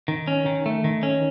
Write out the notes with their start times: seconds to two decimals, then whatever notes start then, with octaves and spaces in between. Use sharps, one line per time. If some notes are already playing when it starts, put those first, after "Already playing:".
0.08 D#3
0.28 C#4
0.46 D#3
0.66 A3
0.84 D#3
1.03 C#4